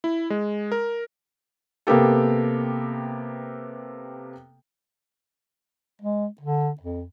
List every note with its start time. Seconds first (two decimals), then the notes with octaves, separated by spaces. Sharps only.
0.04 E4
0.30 G#3
0.72 A#4
1.87 C3 A#3 B3 G4 A4
6.02 G#3
6.41 D3
6.81 F2